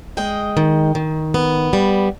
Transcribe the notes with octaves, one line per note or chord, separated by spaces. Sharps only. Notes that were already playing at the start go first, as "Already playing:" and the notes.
G#3 D#5 G5
D#3
D#3
B3
G3